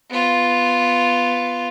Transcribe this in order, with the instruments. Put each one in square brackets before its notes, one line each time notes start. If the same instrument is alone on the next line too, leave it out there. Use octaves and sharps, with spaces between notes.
[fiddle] B3 F4